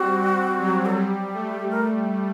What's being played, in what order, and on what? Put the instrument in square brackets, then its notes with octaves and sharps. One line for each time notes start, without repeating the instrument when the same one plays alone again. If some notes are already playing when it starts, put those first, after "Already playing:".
Already playing: [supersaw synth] G3 C4 [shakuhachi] F#4
[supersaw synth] G3
F#3
[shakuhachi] A4
[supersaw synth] G3 [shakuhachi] G4
[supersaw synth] A3
[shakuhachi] A#4